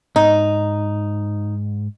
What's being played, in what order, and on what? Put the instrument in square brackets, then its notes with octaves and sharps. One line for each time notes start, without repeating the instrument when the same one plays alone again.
[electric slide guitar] G#2 [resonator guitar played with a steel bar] D#4